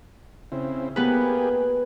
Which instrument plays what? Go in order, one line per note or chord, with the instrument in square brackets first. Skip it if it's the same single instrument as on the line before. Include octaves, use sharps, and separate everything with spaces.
[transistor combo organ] C#3 C4 E4
[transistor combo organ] A#3 G4 G#4 [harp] B3 B4